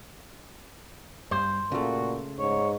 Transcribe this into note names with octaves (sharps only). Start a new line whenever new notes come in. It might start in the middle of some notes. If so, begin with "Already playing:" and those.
G2 C5
A#2 C#3 A3 F#4
G#2 C#5